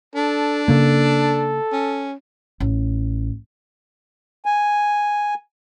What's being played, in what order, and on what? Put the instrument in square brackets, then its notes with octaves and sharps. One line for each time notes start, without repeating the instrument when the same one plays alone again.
[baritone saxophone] D4 [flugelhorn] A4
[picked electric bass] C#3 A#3 [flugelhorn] A4
[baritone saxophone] C#4
[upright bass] A1
[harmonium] G#5